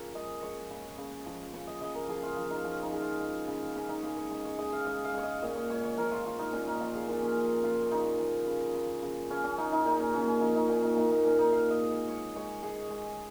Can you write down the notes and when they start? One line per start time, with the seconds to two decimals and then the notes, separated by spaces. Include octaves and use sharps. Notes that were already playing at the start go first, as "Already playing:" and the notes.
Already playing: C#3 F3 G#4 A#4 C#5
0.15 G#3 D#5
0.42 G#3 C#5
0.70 C#3
0.98 C#3
1.26 F3
1.54 C#3 C#5
1.67 D#5
1.81 C#3 D#5
1.95 A#4
2.09 F3 G#4
2.23 F4
2.37 F3
2.51 D#4
2.64 F3 C#4
2.83 D#4
2.92 C#3 G#4
3.02 F4
3.20 G#3
3.48 C#3
3.75 C#3 C#4
3.89 D#4
4.03 C#3 G#4
4.17 C#5
4.31 G#3
4.45 C#5
4.58 G#3 D#5
4.73 F5
4.86 G#3 D#5
5.05 F5
5.14 G#3 C#5
5.23 D#5
5.42 A#2 D#5
5.56 C#5
5.70 G#3 C#5
5.83 C#5
5.97 F3 A#4
6.11 F4
6.25 F3 F4
6.39 D#4
6.52 A#2 C#4
6.67 D#4
6.81 F3 F4
6.95 G#4
7.08 A#2 F4
7.22 C#4
7.36 F3
7.63 C#3 F4
7.91 C#3 D#4
8.19 F3
8.47 C#3
8.75 C#3
9.03 C#3
9.30 C#3 C#4
9.44 C#4
9.58 C#3 D#4
9.72 D#4
9.85 A#2 D#4
10.00 C#4
10.14 A#2 C#4
10.27 C#4
10.41 F3 D#4
10.55 D#4
10.69 A#2 C#4
10.83 D#4
10.97 A#2 D#4
11.11 D#4
11.24 A#2 C#4
11.39 D#4
11.52 A#2 F5
11.70 D#5
11.80 G#3
11.89 D#5
12.07 G#3 C#5
12.36 G#3 C#5
12.62 G#3 G#4
12.91 G#3